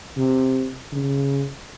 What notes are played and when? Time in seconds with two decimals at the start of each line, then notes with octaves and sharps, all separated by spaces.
0.17 C3
0.92 C#3